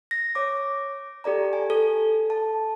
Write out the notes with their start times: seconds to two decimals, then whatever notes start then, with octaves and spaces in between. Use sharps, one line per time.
0.11 A#6
0.35 C#5 D6
1.24 G4 A4 D5 A#5
1.53 G#5
1.70 A4
2.30 A5